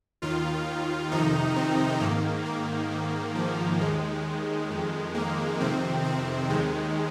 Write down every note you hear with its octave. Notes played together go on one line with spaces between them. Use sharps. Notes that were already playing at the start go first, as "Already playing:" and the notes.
D#2 D#3 F4
F2 C3 D#3 D#4
C4
G#2 D#3 A#3
A#3
G#2 D#3
F3
D#2 D#3 G#3
F2 D#3
A#3
F2 C3 D#3 C4
C4
D#2 D#3 G#3